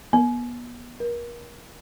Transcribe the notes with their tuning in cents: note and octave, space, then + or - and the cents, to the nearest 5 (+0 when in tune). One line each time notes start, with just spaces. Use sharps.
B3 -30
A#4 +35